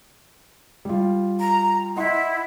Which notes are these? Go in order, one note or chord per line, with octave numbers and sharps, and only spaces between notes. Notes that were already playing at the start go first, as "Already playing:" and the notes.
G3 F4
A#5
E4 D#5 F#5 C6